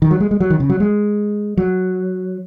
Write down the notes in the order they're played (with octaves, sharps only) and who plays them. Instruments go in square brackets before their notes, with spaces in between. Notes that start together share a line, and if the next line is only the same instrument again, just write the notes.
[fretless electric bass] D#3
F#3
G#3
G#3
F#3
D#3
C#3
F#3
G#3
F#3